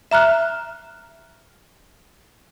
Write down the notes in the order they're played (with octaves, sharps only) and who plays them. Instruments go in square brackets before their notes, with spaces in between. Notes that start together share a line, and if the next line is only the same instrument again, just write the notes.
[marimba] E5 A#5 F6 F#6